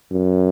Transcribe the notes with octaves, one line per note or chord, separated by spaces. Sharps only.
F#2